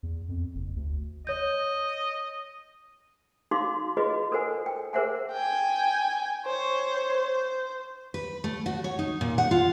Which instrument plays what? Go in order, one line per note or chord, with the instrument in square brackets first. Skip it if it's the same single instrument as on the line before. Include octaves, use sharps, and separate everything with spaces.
[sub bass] E2
F2
F#1
D2
[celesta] C#5 G6 [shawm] D#5
[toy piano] D#4 F#4 F5 C6 D6
F4 F#4 G#4 B4 D#5
A4 A#4 C5 F#5 G#5
G5
G#4 A#4 C5 E5 F#5 G#5
[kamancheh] G5 G#5
C5 C#5
C5
[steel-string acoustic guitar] B4
A3
F#4
C#5
D#4
A#2
F#5
F4